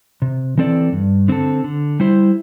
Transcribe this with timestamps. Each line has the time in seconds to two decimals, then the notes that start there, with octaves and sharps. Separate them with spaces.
0.22 C3
0.57 E3 C4 A4 D5
0.92 G2
1.28 D3 C4 A4
1.64 D3
2.00 G3 E4 C5